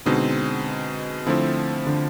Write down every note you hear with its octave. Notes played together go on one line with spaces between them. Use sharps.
B2 D3 G#3 C4 D#4
D3 F3 A3 C4 E4
D3